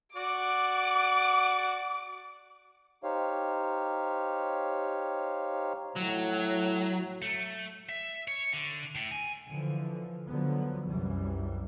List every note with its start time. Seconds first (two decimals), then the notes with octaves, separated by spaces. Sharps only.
0.16 F#4 D5 D6
3.03 D#4 G4 C5 C#5 F5
5.96 A2 F#3
7.22 A3
7.89 E5
8.28 C#5
8.53 D3
8.95 A2
9.11 G#5
9.49 D3 E3 F3
10.27 D3 F3 F#3 B3
10.85 C2 F#2 E3 G3